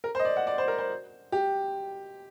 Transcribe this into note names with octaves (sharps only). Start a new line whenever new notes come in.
A#4
C5
D#5
D5
F#5
D5
C5
A#4
C5
G4